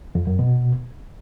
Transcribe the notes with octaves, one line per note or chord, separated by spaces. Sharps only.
F2
F#2
B2